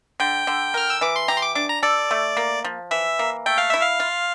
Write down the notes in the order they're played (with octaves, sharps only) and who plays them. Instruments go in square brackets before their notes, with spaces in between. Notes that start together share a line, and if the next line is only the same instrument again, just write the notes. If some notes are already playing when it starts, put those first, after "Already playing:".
[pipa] D3 [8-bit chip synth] G5
[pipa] D3
[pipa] A#4 [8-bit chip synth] F6
[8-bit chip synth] E6
[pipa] E3 [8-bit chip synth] D6
[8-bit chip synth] C6
[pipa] G4 [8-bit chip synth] A#5
[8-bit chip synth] C6
D6
[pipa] D4 [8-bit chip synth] D6
[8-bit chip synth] A#5
[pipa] A4 [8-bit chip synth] D5
[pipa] A3
A#3
F3
[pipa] E3 [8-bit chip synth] E5
[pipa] A#3
[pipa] A3 [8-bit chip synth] G5
[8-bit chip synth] F5
[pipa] E4 [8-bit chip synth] E5
[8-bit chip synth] F5
[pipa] F4